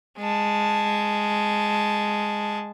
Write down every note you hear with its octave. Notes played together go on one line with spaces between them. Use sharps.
G#3 A5